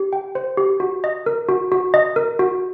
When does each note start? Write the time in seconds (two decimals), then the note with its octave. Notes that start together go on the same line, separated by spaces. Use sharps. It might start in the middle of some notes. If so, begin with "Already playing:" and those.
Already playing: G4
0.13 G5
0.35 C5
0.57 G4
0.80 F#4
1.04 D#5
1.26 A#4
1.49 F#4
1.72 F#4
1.94 D#5
2.16 A#4
2.39 F#4